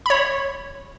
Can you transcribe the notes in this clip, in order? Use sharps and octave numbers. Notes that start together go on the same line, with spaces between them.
C#5 B5